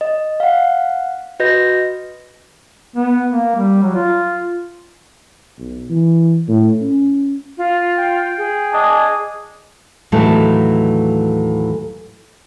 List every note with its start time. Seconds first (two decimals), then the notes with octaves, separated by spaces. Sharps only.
0.01 D#5
0.40 F5 F#5
1.40 F#4 B4 D#5 G6 A#6
2.96 B3
3.31 A#3
3.56 G3
3.82 F#3
3.95 F4
5.58 B1
5.90 E3
6.48 A2
6.81 C#4
7.58 F4
7.98 G5
8.38 G#4
8.73 D4 D#5 G#5
10.12 D#2 A2 E3 F#3 A3 A5